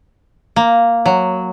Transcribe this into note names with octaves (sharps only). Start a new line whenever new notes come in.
A#3
F#3